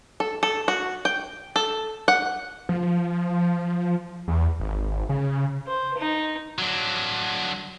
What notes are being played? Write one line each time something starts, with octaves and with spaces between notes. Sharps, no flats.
A4
A4
F#4
G5
A4
F#5
F3
E2
G#1
C#3
C5
D#4
F#3 D4